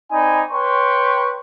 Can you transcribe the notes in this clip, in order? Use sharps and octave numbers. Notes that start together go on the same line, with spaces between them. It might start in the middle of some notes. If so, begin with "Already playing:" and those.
C4 D#4 D5 G#5 B5
B4 C#5 G5 C6 C#6